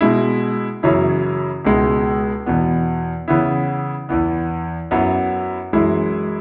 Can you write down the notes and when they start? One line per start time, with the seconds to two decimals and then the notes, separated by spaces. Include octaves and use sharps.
0.01 B2 G#3 E4
0.83 F#2 C#3 E3 C#4 E4
1.65 C#2 B2 G#3 E4
2.46 E2 B2 B3
3.28 C#3 E3 B3 E4
4.09 E2 E3 B3
4.91 F#2 F#3 B3 E4
5.73 F#2 E3 G#3 E4